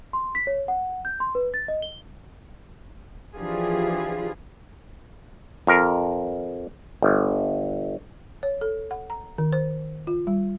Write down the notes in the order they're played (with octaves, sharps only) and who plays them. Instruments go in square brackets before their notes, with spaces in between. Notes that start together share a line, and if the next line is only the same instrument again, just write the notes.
[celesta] C6
B6
C#5
F#5
G6
C6
B4
A6
D#5
G7
[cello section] E3 F3 D4 F4 G4 G#4
[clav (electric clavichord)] F2 A#4
G1
[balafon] C#5
A4
F#5
A#5
D#3
C5
F4
G3